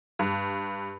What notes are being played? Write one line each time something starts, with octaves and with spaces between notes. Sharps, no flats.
G2